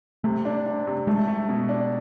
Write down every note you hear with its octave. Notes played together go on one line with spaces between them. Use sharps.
C3 A3
D4
D4
C3
G#3 A3
A3
B2
D4